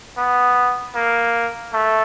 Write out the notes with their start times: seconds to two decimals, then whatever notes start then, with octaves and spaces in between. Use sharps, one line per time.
0.18 B3
0.95 A#3
1.74 A3